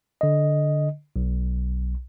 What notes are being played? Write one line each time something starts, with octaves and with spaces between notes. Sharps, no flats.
D3 D#5
B1